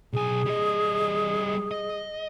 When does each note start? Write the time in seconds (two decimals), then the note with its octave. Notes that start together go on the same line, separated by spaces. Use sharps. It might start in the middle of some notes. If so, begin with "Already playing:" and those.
0.13 B1 G#4 G#5
0.46 G3 D#5
1.71 D#5